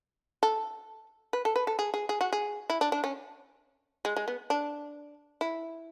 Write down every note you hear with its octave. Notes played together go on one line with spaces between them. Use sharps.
A4
B4
A4
B4
A4
G#4
G#4
G#4
F#4
G#4
E4
D4
D4
C#4
G#3
G#3
B3
D4
E4